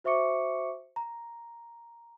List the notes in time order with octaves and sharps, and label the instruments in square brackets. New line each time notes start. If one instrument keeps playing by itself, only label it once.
[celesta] F#4 C5 E5 C#6 D6 C#7
A#5